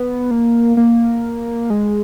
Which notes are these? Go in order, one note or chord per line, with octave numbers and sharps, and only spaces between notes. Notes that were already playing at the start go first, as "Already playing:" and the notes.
Already playing: B3
A#3
A#3
G#3